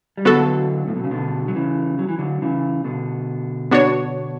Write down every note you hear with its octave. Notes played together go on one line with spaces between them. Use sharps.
G3
D3 F#3 B3 F#4 A4
A2
B2
C#3
B2 D3
F#3
C#3 E3
F#3
E3
D3 F#3
C#3 E3
B2 D3
B3 D4 F#4 C#5